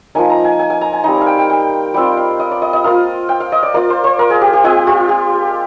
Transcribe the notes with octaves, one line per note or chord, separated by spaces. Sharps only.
F3 A#3 D#4 G#5
A#5
G#5
G#5
G#5
A#5
G#5
G3 C4 D#4 A#5
G#5
F5
G5
G5
G5
G3 C4 F4 G5
F5
D#5
D5
D#5
D#5
A#3 F4 F5
G5
F5
D#5
D5
A#3 F4 D5
C5
C5
A#4
G#4
G4
G4
G#3 C4 F4 G4
F4
G4